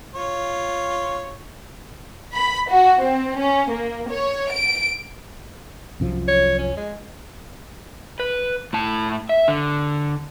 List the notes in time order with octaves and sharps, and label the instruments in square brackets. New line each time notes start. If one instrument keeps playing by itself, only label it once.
[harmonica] F4 C#5
[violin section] B5
F#4
C4
C#4
A#3
C#5
D7
[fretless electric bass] C2 F#2 F3
[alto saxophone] C#5
C#4
G#3
[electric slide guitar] B4
A2 A5
E5
D3